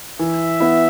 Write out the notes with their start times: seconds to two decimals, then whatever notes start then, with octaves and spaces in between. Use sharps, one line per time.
0.19 E3 E5
0.60 B3 E4